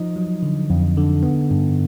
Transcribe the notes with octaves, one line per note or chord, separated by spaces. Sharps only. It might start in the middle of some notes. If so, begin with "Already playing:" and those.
Already playing: F3 D#4 D#5
F#3
D3
F2
D3
B3
G2